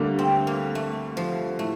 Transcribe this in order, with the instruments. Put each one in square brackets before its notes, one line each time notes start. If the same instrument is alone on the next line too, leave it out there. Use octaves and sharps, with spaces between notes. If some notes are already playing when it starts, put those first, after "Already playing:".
Already playing: [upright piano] D2 D3 G3 [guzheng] A#3
[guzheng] C4
A#3
A3
F3
[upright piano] A2 [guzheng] A3